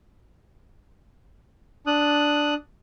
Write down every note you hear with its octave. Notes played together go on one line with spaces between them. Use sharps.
D4 D#6 F#6